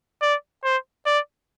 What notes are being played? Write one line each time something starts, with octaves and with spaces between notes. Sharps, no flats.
D5
C5
D5